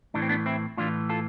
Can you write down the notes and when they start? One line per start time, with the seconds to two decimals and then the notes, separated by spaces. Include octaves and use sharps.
0.14 A2 E3 D4
0.22 C4
0.29 B3 D4
0.46 C4 E4
0.77 A2 E3 D4 F4
1.09 F4 A4